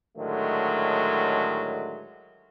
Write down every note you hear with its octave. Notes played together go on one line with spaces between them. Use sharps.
A2 D3 D#3 F#3 G#3 A3